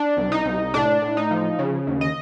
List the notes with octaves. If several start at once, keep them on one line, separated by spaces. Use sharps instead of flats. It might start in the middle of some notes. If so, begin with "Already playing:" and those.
Already playing: D4
C2
D#4
C2
A2 D4
A2
D#4
F3
C#3
D#2
D#5